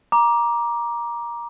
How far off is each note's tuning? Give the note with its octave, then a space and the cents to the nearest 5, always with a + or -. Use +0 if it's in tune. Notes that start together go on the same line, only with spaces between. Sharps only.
A#5 +20 D6 +0